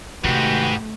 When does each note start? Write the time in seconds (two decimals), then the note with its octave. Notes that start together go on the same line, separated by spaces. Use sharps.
0.24 G#2 C3 D#3 A3 F#4 G4 B4